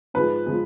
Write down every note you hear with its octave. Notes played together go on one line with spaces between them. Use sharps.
G#2 F3 G#3 B4
F3 G#3